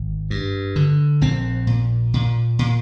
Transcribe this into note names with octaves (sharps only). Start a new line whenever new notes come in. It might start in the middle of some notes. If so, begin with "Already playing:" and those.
Already playing: G#1
G2
D3
A#1 C4
A#2
A#2
A#2